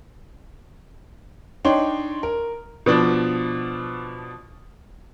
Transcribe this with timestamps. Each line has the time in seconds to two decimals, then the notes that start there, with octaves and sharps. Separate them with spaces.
1.65 D4 D#4 C#5 G5 C6
2.23 A#4
2.86 B2 F3 D4